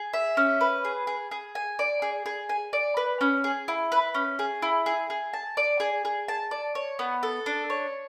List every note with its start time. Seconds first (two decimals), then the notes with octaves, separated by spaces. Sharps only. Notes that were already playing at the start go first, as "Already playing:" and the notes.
Already playing: G#4
0.13 E5
0.37 C#4
0.61 B4
0.85 G#4
1.07 G#4
1.31 G#4
1.55 G#5
1.79 D5
2.02 G#4
2.26 G#4
2.49 G#5
2.73 D5
2.97 B4
3.21 C#4
3.44 G#4
3.68 E4
3.92 B4
4.14 C#4
4.39 G#4
4.62 E4
4.86 G#4
5.10 G#4
5.33 A5
5.57 D5
5.80 G#4
6.05 G#4
6.28 A5
6.51 D5
6.75 C#5
6.99 B3
7.23 A4
7.46 D4
7.70 C#5